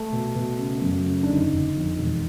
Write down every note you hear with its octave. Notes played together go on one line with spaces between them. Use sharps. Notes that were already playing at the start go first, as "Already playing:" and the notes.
Already playing: A3
B2
B2
C#3
F#2
C#3
D4
G1 D#4
G1
F2
E1